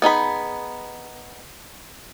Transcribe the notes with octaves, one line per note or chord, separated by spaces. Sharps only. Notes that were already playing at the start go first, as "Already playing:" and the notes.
B3 D#4 G#4 B5